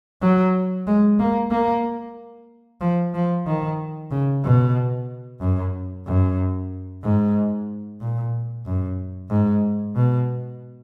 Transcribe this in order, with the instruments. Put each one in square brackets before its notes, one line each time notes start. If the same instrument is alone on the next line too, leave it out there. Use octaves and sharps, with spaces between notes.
[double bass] F#3
G#3
A#3
A#3
F3
F3
D#3
C#3
B2
F#2
F#2
G#2
A#2
F#2
G#2
B2